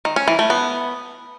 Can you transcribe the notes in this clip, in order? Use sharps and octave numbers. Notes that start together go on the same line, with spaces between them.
D#3
C#4
E3
A3
B3